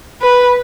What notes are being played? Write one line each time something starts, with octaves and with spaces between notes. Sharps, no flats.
B4